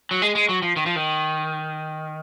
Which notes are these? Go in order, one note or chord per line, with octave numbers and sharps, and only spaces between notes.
F#3
G#3
G#3
F#3
F3
D#3
F3
D#3